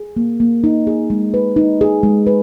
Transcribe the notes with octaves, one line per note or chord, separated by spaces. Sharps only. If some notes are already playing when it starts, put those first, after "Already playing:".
Already playing: G#4
A#3
A#3
D#4
G#4
G#3
B4
D#4
G#4
G#3
B4